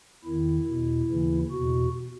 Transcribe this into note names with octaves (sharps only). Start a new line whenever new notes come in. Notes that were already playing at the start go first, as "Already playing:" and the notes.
E2 D#3 E4
E2 B2
D#2 C#3 E3
E2 B2 F#4